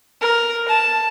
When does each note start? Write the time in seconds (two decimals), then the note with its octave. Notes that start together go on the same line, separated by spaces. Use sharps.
0.21 A#4
0.68 A5